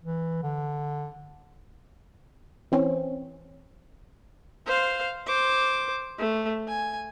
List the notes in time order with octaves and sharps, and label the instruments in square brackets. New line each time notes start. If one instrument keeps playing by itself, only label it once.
[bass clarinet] E3
D3
[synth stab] E3 C4 C#4
[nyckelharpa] C5 F5
C5 D6
A3
G#5